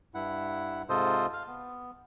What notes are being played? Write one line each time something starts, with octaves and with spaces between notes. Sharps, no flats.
G2 E4 F#5
G#2 C3 F4 A4 C5 D#5
F5
B3